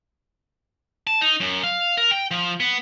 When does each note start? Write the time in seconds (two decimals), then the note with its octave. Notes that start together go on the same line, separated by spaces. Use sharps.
1.07 A5
1.21 D#4
1.40 F#2
1.64 F5
1.97 A#4
2.11 G5
2.31 F3
2.60 B3